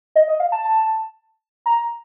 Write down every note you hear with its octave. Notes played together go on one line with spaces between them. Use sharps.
D#5
D#5
F5
A5
A#5